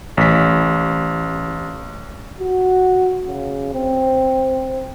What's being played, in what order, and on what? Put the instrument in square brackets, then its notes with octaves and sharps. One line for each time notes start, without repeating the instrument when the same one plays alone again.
[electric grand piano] A1 B6
[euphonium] F#4
C#3
C4